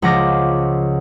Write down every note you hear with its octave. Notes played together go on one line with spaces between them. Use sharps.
C#2 F3 F#5 D6 A#6